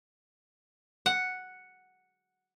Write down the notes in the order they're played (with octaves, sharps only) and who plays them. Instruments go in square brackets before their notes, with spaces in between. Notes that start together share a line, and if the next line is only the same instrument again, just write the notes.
[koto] F#5